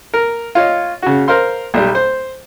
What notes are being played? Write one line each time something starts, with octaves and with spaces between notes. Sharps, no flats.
A#4
F4 C#5 D#5
C#3 F#4
A#4 C5 F5 C6
B1 G3
C5